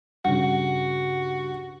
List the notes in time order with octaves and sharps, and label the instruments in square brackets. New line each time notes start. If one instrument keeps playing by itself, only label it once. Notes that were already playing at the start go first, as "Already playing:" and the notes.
[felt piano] G2 C#3 [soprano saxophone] F#4 [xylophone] F#5